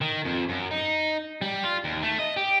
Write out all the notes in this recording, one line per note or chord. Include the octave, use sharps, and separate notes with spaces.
D#3
F2
F#2
D#4
G3
F4
D#2
A3
D#5
G4